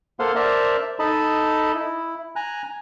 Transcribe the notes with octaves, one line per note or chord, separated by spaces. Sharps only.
A#3 A4 C5 F5 F#5 C6
A#4 C5 D5 E5 A5 A#5
D#4 A4 D#5 A5 B5
E4
G#5 A#5 F#6